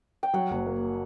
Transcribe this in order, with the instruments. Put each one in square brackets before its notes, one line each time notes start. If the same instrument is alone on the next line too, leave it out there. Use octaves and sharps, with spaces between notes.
[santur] G5
[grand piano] F#3 [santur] F#5
[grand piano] F#1
A#3